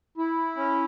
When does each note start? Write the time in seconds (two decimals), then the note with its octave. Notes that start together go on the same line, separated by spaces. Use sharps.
0.18 E4
0.56 C#4